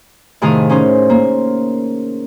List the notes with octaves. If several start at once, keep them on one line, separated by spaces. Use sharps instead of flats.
A2 C3 D#3 G#4 F5
C#4 D#4 C5
A#3